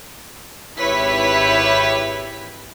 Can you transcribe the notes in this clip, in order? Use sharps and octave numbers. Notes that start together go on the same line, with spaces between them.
G#1 E4 G4 B4 C#5 B6